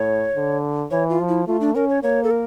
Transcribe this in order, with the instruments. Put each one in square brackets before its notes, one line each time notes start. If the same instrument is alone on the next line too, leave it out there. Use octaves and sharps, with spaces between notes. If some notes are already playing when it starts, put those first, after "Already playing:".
Already playing: [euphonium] A2 [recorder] C#5
[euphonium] D3
[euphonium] E3 [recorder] C#5
[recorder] F4
[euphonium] F3
[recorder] E4
[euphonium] A3 [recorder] F4
[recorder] D4
[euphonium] C#4 [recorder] A#4
[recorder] C#5
[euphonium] A#3 [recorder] C#5
[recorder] A4
A#4